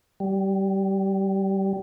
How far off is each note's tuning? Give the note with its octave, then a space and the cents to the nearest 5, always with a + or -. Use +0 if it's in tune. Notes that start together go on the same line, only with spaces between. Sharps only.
G3 -20